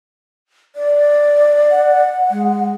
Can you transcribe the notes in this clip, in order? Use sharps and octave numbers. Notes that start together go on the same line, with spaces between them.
D5
F#5
G#3